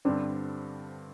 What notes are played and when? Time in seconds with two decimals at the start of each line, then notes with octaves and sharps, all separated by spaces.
0.05 G2 D3 G3 C4 D4